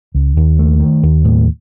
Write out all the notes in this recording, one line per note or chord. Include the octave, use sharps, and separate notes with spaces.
C#2
D#2
A3
D#3
D#2
A2